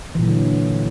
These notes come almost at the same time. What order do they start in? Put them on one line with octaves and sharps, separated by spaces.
E3 A#2 F#3 D3